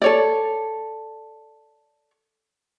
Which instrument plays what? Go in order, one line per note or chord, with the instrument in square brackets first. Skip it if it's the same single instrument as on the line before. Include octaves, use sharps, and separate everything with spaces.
[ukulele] A4 C#5 D5